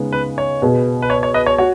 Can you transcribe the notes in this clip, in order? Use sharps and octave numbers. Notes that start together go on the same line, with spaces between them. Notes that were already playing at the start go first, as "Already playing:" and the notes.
Already playing: C#3 G#3 B3 D#4
B4
C#5
B2 B3 G#4
B4
C#5
C#5
B4 D#5
C#5
F#4 C#5